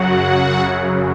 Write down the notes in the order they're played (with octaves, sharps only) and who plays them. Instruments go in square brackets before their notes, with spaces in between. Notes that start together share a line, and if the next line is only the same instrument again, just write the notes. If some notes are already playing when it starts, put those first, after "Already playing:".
Already playing: [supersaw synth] F#2 C#3 F#3 F#4 F#5